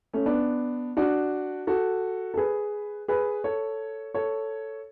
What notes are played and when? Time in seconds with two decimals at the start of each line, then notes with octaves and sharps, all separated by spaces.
0.13 A3 C#4
0.26 B3 D4
0.97 D4 F#4
1.67 F#4 A4
2.34 A4
2.37 G#4 B4
3.08 G#4 B4
3.44 A4 C#5
4.14 A4 C#5